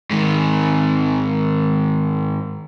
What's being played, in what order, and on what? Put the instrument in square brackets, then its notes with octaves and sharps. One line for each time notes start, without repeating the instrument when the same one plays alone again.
[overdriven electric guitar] G#2 D#3